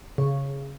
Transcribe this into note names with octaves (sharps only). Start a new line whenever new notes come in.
C#3